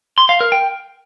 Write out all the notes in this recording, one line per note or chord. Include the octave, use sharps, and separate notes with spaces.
C6
F5
A#4
G5